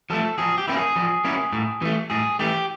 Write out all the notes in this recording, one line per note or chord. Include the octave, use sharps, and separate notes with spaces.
F3 A3 A4
F3 G#4
G4
A#3 C#4 E4
G#4
F3
A#3 C#4 E4
A2
E3 A3
A2 G#4
E3 A3 G4